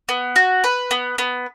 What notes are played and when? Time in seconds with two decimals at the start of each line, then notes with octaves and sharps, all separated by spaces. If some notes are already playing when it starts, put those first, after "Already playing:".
0.09 B3
0.36 F#4
0.64 B4
0.91 B3
1.18 B3